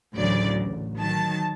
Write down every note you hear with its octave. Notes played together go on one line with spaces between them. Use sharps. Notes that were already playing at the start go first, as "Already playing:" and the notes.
A1 D2 C#3 F#3 D5
A1
D#3 F#3 A5